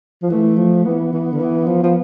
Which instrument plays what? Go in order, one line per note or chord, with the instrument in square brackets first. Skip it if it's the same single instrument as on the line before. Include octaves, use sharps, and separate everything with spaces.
[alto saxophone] F3
[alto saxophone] E3 [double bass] A3
[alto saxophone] F3
[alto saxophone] E3 [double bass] B3
[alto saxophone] E3
D3
E3
F3
F3